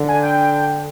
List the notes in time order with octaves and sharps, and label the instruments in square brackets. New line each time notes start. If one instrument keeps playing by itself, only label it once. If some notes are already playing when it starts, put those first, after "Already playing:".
Already playing: [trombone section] D3
[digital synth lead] G#5
G5